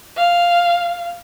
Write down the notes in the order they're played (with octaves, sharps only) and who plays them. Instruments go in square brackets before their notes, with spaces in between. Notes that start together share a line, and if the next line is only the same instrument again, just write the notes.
[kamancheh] F5